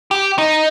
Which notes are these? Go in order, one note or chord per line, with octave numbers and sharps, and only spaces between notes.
G4
D#4